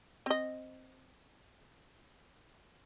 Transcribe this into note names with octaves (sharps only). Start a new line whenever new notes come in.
C4 D#5